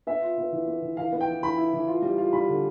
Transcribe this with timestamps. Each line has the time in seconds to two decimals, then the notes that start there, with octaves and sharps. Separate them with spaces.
0.07 B3 E5
0.22 F4
0.38 B3
0.52 E3
0.67 B3
0.82 E3
0.97 E3 F5
1.13 B3
1.21 G5
1.28 E3
1.43 E3 B5
1.57 E4
1.73 E3
1.88 F4
2.02 G3
2.18 F4
2.33 G3 B5
2.48 D3